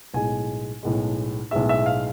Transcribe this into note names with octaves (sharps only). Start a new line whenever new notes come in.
B1 A2 G#3 G#5
B1 A2 G#3
B1 A2 G#3 E5
E5
F5